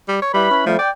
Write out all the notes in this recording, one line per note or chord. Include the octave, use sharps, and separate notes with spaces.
G3
C#5
G3 E4 B4 B5
C#4
F2 F3 G3 A3
D5 G5